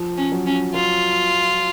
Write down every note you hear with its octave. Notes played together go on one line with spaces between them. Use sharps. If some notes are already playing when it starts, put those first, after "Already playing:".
Already playing: F3
C#4
F#3
C#4
F#3 F4